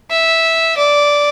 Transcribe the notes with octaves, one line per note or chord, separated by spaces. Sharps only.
E5
D5